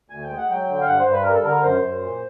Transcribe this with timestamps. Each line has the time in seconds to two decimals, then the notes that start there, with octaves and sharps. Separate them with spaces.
0.10 D2 G#5
0.23 G5
0.30 G#3
0.38 F#5
0.49 F#3 G5
0.68 D3
0.81 F5
0.86 G2 F#5
0.99 C5
1.06 G2
1.12 B4
1.22 G3 A#4
1.33 A4
1.44 D3 A#4
1.63 F#2 C5
1.83 F#2
2.01 A#2